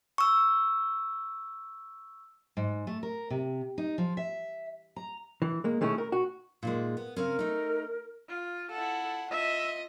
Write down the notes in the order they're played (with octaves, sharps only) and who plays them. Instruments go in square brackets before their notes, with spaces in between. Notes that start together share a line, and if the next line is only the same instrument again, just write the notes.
[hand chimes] C#6 E6
[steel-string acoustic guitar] G#2
A3
A#4
C3
D#4
F3
E5
A#5
[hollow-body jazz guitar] E3
G#3 A#3
D#3 G#3 A3 C#4 E4
A#4
F#4
[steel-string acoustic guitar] A#2 D#3 G#3
B3
[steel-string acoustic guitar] C#3 C4 C#4 [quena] A#4
[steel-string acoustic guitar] A3 D#4
[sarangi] F4
[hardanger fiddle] E4 F#5 [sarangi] A4
[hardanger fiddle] F4 D#5 [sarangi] E5